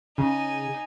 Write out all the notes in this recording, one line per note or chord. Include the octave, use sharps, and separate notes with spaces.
C#3 D#4 G#5